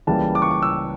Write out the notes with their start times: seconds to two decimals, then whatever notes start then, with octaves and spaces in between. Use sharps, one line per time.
0.07 C#2 C#3 E3 G3 A#3 A5
0.35 D6
0.42 C#6
0.51 D6
0.62 E6